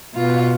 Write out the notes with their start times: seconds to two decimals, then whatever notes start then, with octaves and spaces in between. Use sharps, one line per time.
0.15 B2 F4